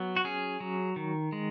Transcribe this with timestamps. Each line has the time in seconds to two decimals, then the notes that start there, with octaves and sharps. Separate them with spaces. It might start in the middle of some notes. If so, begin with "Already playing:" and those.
Already playing: F#3 B3
0.16 F#4
0.24 C#4 G#4
0.60 F#3
0.96 D#3
1.32 G#3